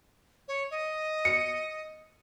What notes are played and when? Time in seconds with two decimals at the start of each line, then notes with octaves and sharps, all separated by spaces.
0.48 C#5
0.71 D#5
1.25 C#7